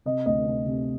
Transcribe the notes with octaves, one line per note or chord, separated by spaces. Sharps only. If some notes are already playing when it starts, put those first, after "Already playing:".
C3 D#5
D2 D#5
C3
C3